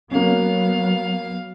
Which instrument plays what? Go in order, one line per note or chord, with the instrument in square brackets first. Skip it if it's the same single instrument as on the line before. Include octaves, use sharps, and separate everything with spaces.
[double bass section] F#3 B3 [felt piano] A#3 C#4 [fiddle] F5